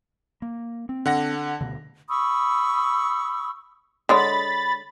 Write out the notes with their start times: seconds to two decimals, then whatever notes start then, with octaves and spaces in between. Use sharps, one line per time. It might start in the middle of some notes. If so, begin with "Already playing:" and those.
0.42 A#3
0.89 C4
1.06 D3 F#5 A#6
1.61 D2 B2 D3
2.09 B5 C#6 D#6 E6
4.09 D3 G#3 C#5 B5 A6